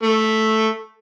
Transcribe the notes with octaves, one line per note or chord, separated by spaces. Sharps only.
A3